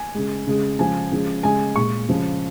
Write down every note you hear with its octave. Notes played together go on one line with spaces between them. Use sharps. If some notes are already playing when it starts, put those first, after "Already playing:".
Already playing: G#5
C#3 G#3
C#3 G#3
C#3 F3 G#3 G#5
C#3 F3 G#3
C#3 G#3 G#5
A#2 G#3 C#6
C#3 F3 G#3